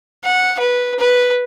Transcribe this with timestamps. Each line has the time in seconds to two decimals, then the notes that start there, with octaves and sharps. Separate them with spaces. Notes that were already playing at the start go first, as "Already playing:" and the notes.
0.24 F#5
0.59 B4
0.99 B4